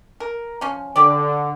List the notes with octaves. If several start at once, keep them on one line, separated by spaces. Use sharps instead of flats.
A#4
F3 C#4
D3 G4 D5